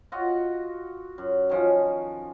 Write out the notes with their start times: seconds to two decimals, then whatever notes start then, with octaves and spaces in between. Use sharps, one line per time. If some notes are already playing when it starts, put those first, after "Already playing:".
0.12 F4 F#4 D#5
1.18 F#2
1.49 D#3 F3 C#4